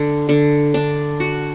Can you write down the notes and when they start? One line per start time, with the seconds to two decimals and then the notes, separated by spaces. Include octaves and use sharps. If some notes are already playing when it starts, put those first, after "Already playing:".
Already playing: D3
0.29 D3
0.74 D4
1.20 F#4